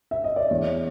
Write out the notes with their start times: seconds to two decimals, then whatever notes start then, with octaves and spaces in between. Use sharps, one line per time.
0.11 E5
0.24 D#5
0.36 D5
0.50 E2 C#5